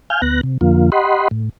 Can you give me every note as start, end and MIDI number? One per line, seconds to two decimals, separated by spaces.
0.10 0.21 77
0.10 0.21 80
0.10 0.21 89
0.10 0.21 91
0.22 0.41 38
0.22 0.41 59
0.22 0.41 90
0.22 0.41 94
0.43 0.58 48
0.61 0.90 41
0.61 0.90 50
0.61 0.90 53
0.61 0.90 58
0.61 0.90 65
0.92 1.28 67
0.92 1.28 75
0.92 1.28 78
0.92 1.28 83
0.92 1.28 84
1.31 1.49 45